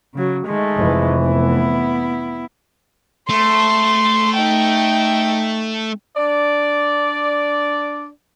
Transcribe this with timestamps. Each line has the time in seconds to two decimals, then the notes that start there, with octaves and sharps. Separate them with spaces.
0.14 C#3 F#3
0.47 D#3 G#3 A3
0.76 F1 E3
1.27 B3 E4
3.29 A3 C6
4.36 D#4 G5
6.17 D4 D5